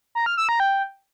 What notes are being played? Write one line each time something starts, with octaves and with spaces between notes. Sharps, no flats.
A#5
F6
E6
A#5
G5